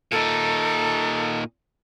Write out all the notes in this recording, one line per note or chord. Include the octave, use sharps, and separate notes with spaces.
A#2 D#4 A4